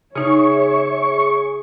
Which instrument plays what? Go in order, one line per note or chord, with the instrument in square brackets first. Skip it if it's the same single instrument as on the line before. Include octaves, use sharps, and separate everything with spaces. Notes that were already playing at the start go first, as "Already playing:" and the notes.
[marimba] C#3 D#4 [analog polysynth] G#4 [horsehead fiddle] C#5 E5 [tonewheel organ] C#6